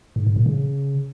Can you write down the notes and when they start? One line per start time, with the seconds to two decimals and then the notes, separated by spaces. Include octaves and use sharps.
0.16 G#2
0.27 G#2
0.36 A#2
0.46 C#3